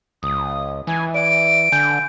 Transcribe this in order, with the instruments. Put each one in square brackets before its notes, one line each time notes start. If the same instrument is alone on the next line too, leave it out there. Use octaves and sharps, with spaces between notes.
[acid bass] C#2 [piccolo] D#6
[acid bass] E3 [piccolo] G#5
[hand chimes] D5 E5 [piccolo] D7
[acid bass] D3 [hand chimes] G#5 G6